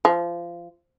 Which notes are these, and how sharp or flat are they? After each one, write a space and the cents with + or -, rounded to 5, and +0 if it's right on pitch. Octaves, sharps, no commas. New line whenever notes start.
F3 -20